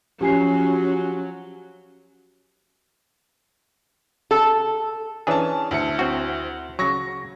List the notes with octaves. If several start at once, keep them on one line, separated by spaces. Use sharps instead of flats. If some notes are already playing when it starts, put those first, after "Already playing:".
F3 F#3 C#4 G4 G#5 C7
A4
E3 C#4 D4 G#4 A5
D2 E4 C#7
C4 F#4
C#3 F#3 C#6 A#6